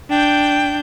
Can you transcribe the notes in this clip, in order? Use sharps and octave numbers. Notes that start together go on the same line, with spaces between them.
D4 G5 G6